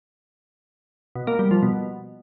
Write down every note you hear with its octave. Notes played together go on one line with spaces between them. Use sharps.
B2
A#3
G3
F3
B2